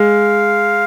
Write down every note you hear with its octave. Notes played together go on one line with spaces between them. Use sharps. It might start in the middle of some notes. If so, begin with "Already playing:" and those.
Already playing: G#3 F5